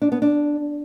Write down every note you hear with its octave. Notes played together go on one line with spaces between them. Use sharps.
D4
B3
D4